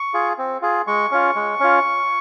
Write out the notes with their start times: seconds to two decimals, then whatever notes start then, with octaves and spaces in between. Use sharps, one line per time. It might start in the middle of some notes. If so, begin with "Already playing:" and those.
Already playing: C#6
0.14 F4 G#4
0.38 C4
0.62 F4 G#4
0.87 G#3 C#6
1.11 C#4 F4
1.35 G#3
1.60 C#4 F4